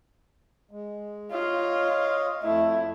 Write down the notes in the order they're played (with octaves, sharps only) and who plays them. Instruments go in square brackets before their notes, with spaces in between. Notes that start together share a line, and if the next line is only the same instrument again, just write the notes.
[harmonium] G#3
[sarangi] F4 [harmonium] C#5 D#5 F5
[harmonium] F2 A3 [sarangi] E4